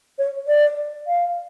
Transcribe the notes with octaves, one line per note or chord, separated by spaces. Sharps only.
C#5
D5
F5